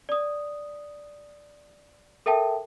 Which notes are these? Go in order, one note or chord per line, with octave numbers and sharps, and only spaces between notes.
D5 D#6
A4 A#4 E5 G5 A5